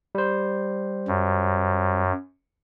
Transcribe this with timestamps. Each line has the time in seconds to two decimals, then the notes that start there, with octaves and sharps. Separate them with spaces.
0.15 G3 C5
1.08 F#2